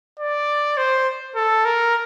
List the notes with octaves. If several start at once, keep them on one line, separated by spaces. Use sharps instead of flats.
D5
C5
A4
A#4